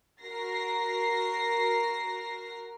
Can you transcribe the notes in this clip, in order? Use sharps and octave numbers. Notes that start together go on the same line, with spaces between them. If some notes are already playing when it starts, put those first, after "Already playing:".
F#4 A#4 A#6 C7